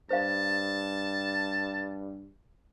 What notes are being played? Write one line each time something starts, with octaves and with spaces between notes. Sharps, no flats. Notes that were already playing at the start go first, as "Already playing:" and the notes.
G2 C5 F5 A5